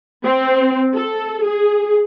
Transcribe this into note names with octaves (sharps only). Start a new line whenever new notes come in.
C4
A4
G#4